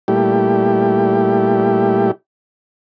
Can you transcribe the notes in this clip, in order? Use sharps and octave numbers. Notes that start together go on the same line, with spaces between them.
A#2 G3 A3 E4 G4